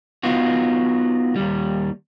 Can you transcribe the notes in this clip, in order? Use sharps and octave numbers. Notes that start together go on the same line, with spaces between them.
B3 D#4 F4 F#4
D#2 G3